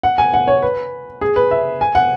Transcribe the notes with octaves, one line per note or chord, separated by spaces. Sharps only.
F#5
G#5
F#5
C#5
B4
G#4
B4
E5
G#5
F#5